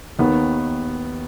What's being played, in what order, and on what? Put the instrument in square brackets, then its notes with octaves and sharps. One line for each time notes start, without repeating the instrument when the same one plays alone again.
[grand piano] D#2 D#3 B3